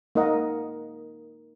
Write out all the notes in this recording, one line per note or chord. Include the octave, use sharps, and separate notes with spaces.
A#3 D#4 A#4 D#5 F#5